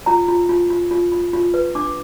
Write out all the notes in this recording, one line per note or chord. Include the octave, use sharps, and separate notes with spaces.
F4 A#5
F4
F4
F4
F4
F4
F4
B4
D4 D6